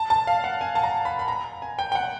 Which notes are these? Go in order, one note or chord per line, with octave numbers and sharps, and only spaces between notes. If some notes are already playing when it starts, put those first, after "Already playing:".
Already playing: A5
A5
F5
F#5
G#5
A5
A#5
B5
B5
A#5
G#5
G5
G5
F#5